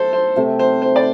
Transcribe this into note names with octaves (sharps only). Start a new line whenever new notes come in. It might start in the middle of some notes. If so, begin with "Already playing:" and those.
Already playing: A3 A4 C5
C5
C3 A3 C4 G4
C5
C5
D5